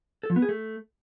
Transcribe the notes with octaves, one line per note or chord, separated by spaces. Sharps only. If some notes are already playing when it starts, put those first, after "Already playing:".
A4
F3
B3
G#4
A3